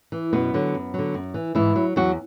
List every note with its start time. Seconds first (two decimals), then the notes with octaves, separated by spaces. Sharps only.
0.12 E3
0.33 F#2 B2 B3
0.54 D3 F#3
0.74 F#2
0.94 D3 F#3
1.14 F#2
1.34 E3
1.55 G#2 E3 E4
1.76 F#3
1.96 E2 F#3 F#4